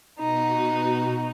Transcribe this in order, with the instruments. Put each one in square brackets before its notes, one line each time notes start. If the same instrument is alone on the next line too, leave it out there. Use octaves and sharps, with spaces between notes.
[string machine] B2 F#4 [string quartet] D#4